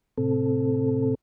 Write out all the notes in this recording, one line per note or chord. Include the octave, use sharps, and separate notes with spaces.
A2 C3 C4 A4